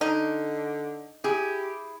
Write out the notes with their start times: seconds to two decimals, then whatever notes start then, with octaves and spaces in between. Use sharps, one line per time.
0.01 D3 D#4
1.24 E4 G4 G#4